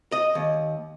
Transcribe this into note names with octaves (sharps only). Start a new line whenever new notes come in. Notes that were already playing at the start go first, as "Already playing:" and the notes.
D#5
D#2